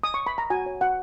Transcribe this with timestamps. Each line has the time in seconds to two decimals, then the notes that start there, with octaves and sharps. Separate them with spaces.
0.04 D#6
0.14 C#6
0.26 B5
0.38 A#5
0.50 F#4 G#5
0.66 C#5
0.81 F#4 F#5